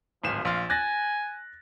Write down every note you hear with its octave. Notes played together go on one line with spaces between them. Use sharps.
D1 G#1 F3 E7
A#1 F5 C6 A6
G#5 F#6 A6 A#6